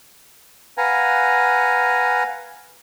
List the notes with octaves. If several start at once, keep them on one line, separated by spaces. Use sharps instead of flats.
B4 F5 F#5 G#5 A#5